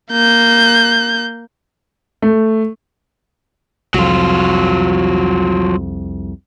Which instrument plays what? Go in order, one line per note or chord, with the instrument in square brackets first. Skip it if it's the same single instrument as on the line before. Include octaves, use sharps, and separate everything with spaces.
[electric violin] A#3 G6
[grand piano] A3
[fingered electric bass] C2 F2 [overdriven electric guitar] F#3 F4